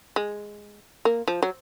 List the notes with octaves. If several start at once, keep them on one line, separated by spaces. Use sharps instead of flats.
G#3
A#3
F3
F#3